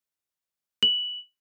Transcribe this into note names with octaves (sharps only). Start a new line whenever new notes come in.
F#7